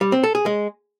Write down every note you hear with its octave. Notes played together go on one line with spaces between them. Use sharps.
G3
C4
A4
G#4
G#3